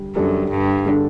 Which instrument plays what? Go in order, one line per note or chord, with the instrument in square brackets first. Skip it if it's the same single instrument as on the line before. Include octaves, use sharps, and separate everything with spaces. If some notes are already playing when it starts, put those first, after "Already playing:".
Already playing: [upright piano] D3 G3
[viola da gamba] F#2 [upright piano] D3 G3 D4 A4
[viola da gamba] G2
[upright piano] D3 G3 D4 A4